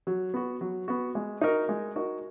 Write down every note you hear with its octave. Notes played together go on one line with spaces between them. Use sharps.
F#3
B3 F#4
F#3
B3 F#4
G#3
D#4 F#4 A#4
G#3
D#4 F#4 A#4